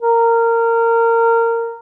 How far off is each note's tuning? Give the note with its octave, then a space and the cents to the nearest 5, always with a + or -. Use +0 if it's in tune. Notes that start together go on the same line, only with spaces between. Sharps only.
A#4 -20